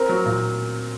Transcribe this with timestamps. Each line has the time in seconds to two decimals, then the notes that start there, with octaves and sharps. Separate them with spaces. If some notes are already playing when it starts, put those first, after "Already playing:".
Already playing: C4 A#4
0.09 F#3
0.26 A#2